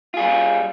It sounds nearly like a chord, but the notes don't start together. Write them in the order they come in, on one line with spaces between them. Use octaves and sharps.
F4 G#4 G3